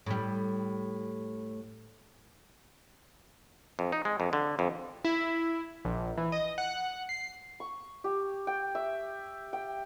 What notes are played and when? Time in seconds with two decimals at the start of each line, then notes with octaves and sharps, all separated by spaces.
0.06 A2 G3
3.79 F2
3.92 D#4
4.05 G#3
4.20 F2
4.33 D3
4.59 F2
5.05 E4
5.85 A#1
6.18 E3
6.32 D#5
6.58 F#5
7.09 C7
7.60 C#6
8.04 G4
8.47 G5
8.75 E5
9.53 G5